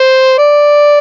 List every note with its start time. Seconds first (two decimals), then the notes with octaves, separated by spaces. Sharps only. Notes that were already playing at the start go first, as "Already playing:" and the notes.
Already playing: C5
0.38 D5